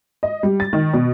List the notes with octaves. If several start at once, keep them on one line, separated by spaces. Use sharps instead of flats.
D#5
G3
A6
D#3
B2